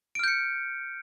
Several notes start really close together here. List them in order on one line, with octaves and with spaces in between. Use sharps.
D7 F6 G6 C#7